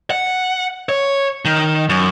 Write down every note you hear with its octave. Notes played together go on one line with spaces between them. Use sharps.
F#5
C#5
D#3
F#2